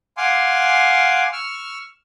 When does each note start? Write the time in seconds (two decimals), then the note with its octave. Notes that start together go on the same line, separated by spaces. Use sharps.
0.17 F5 F#5 G#5 C6 D6
1.33 C#6 E6 F6